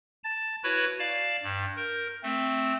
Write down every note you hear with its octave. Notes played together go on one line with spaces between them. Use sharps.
A5 A6
E4 F#4 B4 C#5
D5 F5 A5
G2
A#4 G6
A3 C4